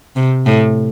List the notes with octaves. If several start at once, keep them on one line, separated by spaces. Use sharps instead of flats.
C3
A2